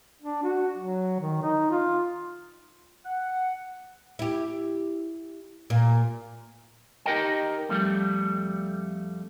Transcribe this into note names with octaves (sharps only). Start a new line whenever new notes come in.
D4
F#4
F#3
D#3
D#4
F4
F#5
E4 G4
A#2
D#4 G4 A#4 D#5 G5
F2 G3 A3